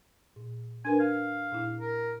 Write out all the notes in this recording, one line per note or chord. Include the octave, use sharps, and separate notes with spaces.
A#2
D4 A#4 B4 G#5
F5
A#2 E4
A#4